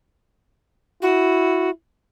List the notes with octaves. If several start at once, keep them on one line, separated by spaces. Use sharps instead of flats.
E4 F#4